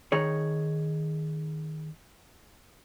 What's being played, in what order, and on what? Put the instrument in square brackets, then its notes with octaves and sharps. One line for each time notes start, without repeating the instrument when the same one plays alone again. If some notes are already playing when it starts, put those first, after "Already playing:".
[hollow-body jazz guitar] D#3 D#4 G#4 C#5